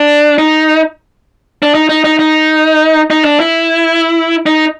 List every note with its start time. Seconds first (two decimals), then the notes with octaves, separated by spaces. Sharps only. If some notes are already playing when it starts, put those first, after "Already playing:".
Already playing: D4
0.39 D#4
1.63 D4
1.74 D#4
1.89 D#4
2.04 D#4
2.19 D#4
3.10 D#4
3.25 D4
3.40 E4
4.46 D#4